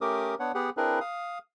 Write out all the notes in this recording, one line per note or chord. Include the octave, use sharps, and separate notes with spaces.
A3 C#4 G4 A#4 D6 D#6
B3 D4 C#5 F#5
B3 G4 G#4 F#5
C4 D4 E4 G#4 A#4 B4
F5 D#6